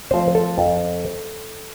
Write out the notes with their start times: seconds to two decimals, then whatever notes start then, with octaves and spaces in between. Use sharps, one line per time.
0.11 F3 A3 C4 C5
0.35 A4
0.58 F2